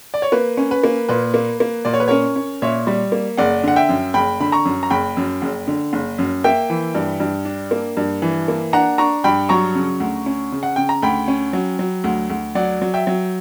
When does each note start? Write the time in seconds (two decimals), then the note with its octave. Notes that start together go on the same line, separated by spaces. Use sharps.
0.14 D5
0.22 C#5
0.32 A#3 B4
0.57 C#4
0.71 B4
0.84 A#3
1.09 A#2 B4
1.34 A#3
1.60 A#3
1.85 A#2 D5
1.93 C#5
2.00 B4
2.08 C#4 A#4 C#5
2.36 C#4
2.62 A#2 C#5 E5
2.87 G3
3.12 A#3
3.37 F#1 D5 F#5
3.63 D3 F#5
3.76 E5 G5
3.89 F#2
4.14 F#1 G5 B5
4.40 D3 B5
4.52 A#5 C#6
4.65 F#2
4.83 A#5
4.90 F#1 G5 B5
5.17 F#2
5.42 F#1
5.67 D3
5.93 F#1
6.18 F#2
6.44 A#3 E5 G5
6.70 E3
6.95 G2
7.20 G2
7.45 D4
7.71 A#3
7.97 G2
8.22 E3
8.48 A#3
8.73 D4 F#5 A#5
8.98 D4 A#5 C#6
9.24 G2 G5 B5
9.49 F#3 A#5 C#6
9.75 C#3
10.00 D2
10.26 C#4
10.52 C#3
10.63 F#5
10.76 C#3 G5
10.89 A#5
11.03 D2 G5 B5
11.28 C#4
11.53 F#3
11.79 F#3
12.04 D2
12.30 D2
12.55 F#3 D5 F#5
12.82 F#3
12.94 E5 G5
13.07 F#3